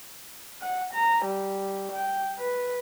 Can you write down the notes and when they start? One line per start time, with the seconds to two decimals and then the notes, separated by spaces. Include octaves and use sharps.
0.62 F#5
0.93 A#5
1.25 G3
1.92 G5
2.39 B4